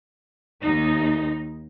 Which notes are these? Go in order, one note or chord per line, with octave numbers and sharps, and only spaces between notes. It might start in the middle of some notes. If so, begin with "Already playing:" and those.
D#2 D#4